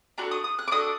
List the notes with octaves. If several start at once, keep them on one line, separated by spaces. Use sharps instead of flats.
D4 F#4 A4 A#5
D#6
D#6
F#6
D6
D4 F#4 A4 D#6